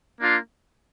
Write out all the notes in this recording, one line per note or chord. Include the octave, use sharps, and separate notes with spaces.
A#3 D4 F4